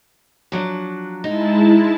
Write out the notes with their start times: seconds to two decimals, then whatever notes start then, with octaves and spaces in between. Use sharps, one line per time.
0.52 F3 F#3 D4
1.24 G#3 D#4 E4 A5